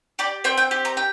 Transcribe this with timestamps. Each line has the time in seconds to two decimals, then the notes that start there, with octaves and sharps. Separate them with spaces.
0.19 G4 D5
0.44 C4 G5
0.57 G5
0.71 G4
0.85 A#5
0.97 G5